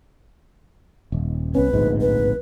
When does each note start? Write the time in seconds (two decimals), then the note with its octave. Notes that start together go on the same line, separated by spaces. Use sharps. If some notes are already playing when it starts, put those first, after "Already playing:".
1.12 D#1
1.55 C2 B3 C#4 B4
1.73 D1 A#1 G#2
2.01 B4